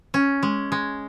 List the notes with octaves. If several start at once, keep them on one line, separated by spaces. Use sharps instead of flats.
C#4
G#3
G#3